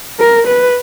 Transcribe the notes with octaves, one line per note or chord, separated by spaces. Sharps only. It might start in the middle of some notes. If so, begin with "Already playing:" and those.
A#4
B4